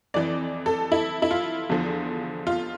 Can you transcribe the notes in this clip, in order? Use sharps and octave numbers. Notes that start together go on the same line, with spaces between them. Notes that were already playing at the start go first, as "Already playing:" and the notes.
F2 E3 D5
A4
E4
E4
F4
E2 D3 F3
F4